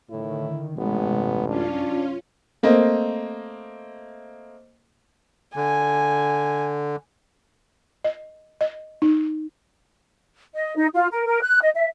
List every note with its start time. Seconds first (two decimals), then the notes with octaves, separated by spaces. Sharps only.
0.11 A2 D3 D#3 E4
0.78 A1 G2 C3 G#3 B3
1.48 F#2 C#4 D4 F4
2.63 A3 A#3 C4 D#5
5.56 D3 G#5
8.04 D#5
8.61 D#5
9.02 D#4
10.55 D#5
10.76 D#4
10.95 F4
11.12 A#4
11.27 A#4
11.42 F#6
11.62 D#5
11.75 E5